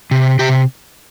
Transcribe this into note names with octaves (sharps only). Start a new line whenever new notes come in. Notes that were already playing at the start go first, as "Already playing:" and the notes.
C3
C3 G4